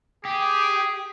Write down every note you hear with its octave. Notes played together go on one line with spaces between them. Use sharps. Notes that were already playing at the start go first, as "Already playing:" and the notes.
G4 G#4